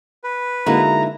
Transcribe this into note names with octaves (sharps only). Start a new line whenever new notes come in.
B4
D3 G#3 A#3 D#4 E4 F#4 A#5